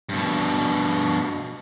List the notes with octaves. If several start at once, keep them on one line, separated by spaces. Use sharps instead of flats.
G2 B2